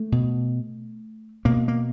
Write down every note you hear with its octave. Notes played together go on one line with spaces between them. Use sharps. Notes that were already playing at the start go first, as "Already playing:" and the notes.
Already playing: A3
B2
B2 A#3
A#3